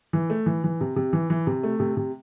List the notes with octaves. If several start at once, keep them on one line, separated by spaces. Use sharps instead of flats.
E3
A3
E3
E3
C3
C3
E3
E3
C3
A3
C3
C3